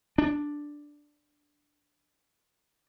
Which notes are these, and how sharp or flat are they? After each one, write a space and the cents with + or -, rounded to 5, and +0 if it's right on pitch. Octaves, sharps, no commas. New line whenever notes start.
D4 +0